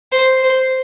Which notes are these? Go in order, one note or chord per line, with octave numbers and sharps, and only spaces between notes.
C5
C5